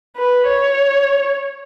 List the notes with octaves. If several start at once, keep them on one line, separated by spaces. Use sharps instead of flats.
B4
C#5